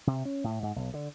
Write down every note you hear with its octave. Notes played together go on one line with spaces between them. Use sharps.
C3
C#4
A2
G#2
B1
D3